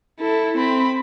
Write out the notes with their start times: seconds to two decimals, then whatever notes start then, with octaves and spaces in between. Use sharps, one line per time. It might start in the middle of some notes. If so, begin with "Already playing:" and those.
0.20 E4 A4
0.57 C4 B5